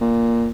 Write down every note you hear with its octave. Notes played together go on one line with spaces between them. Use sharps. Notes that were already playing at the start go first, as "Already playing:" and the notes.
A#2